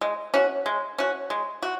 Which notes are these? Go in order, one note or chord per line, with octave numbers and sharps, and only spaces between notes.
G#3
C#4 F#4
G#3
C#4 F#4
G#3
F#4